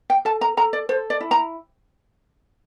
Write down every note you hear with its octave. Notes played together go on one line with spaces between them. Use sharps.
G5
A4 A5
A#5
A4 A#5
D5
A4 C5
D5
E4
A#5